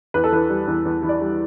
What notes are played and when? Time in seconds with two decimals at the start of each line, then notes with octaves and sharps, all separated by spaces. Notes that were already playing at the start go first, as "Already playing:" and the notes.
0.14 E2 B4
0.24 A4
0.32 E3 B4
0.49 G3
0.67 E2
0.85 E2
1.03 E3
1.09 D5
1.21 G3